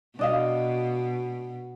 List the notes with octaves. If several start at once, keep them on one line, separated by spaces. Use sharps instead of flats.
B2 D4 D#5 F5